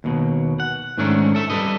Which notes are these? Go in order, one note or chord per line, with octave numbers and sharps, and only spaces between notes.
D#2 B2
F#5
G#2 D#3 A3 C#4 D4
A4 E5
G3 A4 B4 D#5